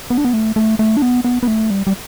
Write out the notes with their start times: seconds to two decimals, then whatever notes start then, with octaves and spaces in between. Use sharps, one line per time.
0.10 B3
0.18 D4
0.25 B3
0.33 A3
0.56 A3
0.79 A3
0.97 D4
1.02 B3
1.25 B3
1.43 B3
1.48 A3
1.70 G3
1.87 G3